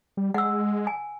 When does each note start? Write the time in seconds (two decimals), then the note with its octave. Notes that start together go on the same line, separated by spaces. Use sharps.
0.17 G3
0.34 G#3 F#5 E6
0.87 G#5